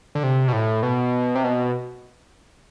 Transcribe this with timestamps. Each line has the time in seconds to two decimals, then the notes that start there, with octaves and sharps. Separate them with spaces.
0.15 D3
0.23 C3
0.48 B2
0.53 A2
0.83 B2
1.35 C3
1.44 B2